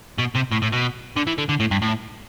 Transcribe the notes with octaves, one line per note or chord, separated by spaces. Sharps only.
B2
C3
A2
A2
B2
D3
E3
D3
D3
A2
G2
A2